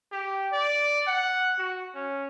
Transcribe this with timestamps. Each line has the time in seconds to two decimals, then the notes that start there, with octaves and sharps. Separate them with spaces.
0.11 G4
0.52 D5
1.07 F#5
1.58 F#4
1.95 C#4